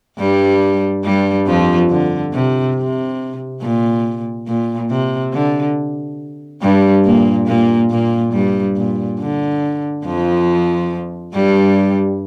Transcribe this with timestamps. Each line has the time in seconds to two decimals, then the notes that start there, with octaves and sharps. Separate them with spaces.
0.18 G2 G3
1.04 G2 G3
1.46 F2 F3
1.90 D3
2.33 C3
2.76 C3
3.61 A#2
4.48 A#2
4.90 C3
5.33 D3
6.62 G2 G3
7.05 A#2 A#3
7.47 A#2 A#3
7.90 A#2 A#3
8.33 G2 G3
8.76 A#2
9.20 D3
10.05 F2 F3
11.34 G2 G3